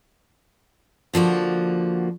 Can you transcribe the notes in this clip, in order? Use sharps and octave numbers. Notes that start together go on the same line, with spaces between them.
D3 F3 A#3 F#4